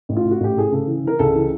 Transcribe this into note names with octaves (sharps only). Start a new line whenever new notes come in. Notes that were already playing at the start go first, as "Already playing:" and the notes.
A1
F4
A2
F#4
A1 G4
A2 G#4
C#3 A4
E3
E3 A#4
C#2 A4
E3